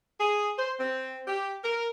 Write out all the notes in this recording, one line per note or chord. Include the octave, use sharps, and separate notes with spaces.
G#4
C5
C4
G4
A#4